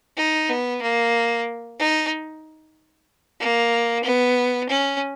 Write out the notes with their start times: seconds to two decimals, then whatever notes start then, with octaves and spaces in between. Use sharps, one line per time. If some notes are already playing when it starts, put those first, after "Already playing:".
0.17 D#4
0.49 B3
0.82 A#3
1.79 D#4
3.40 A#3
4.04 B3
4.69 C#4